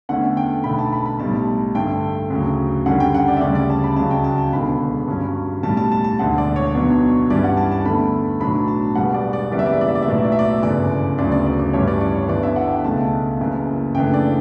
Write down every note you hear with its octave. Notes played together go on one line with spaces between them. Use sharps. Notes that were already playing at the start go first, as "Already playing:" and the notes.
E2 D3 A3 C#4 F#5
G5
B1 B2 A3 D4 B5
A5
B5
B5
B1 A2 G3 A5
G2 D3 A3 G5
D2 C#3 F#3
F#2 D3 G3 C#4 F#5
G5
F#5
D5
E5
D2 C#3 G3 C#4 D5
D5
A5
B5
C#2 C#3 F#3 A5
G5
A5
A5
E1 E2 D3 B5
G2 F#3 C#4
B1 A2 G3 A5
A5
A5
A5
E1 D2 D3 F#5
D5
C#5
B1 B2 F#3 B3 D4
G2 E3 G3 C#4 D5
F#5
A5
A5
E2 D3 A3 B5
B1 A2 F#3 B3 D4 B5
A5
E1 E2 B2 G3 B3 F#5
D5
D5
F#1 F#2 E3 G3 B3 D5
E5
D5
E5
D5
E5
D5
E5
B1 A2 F#3 B3 D5
E5
D5
E5
D5
G1 F#2 C#3 E3 D5
D2 C#3 F#3 B3 D5
D5
D5
D5
A1 G2 E3 G3 C#4 C#5
D5
D5
C#5
G1 G2 E3 B3 D4 D5
E5
F#5
G5
C#2 B2 A3 A5
F#1 F#2 E3
F#2 C#3 E3 A3 D4 G5
D5